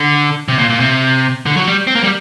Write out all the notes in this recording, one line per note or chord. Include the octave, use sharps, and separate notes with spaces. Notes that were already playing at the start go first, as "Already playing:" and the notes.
Already playing: D3
C3
A#2
A#2
C3
D3
F#3
G3
C4
A#3
G3